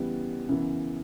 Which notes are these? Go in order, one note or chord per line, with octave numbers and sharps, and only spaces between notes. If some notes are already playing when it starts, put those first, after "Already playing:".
Already playing: C#3 E3 G3 B3
F#2 C#3 E3 B3